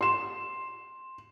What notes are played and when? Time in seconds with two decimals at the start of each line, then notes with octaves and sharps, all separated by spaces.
0.01 C6 E7